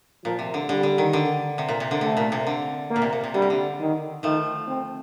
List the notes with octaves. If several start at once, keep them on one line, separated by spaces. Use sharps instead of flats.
A#2 F3
C3
D3
D3 G3
D3
D#3
D3
C3
A#2
C3
D3
C3 A3
A#2
C3
D3
A#3
A#2
C3
A#2
C3
D3 G3
C3
D3
D#3
D#3 F3 A3
C4